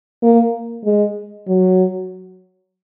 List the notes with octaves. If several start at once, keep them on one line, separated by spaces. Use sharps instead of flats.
A#3
G#3
F#3